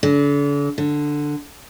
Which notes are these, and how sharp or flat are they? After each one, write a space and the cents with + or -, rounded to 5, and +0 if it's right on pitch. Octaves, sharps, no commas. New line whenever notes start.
D3 -40
D3 +5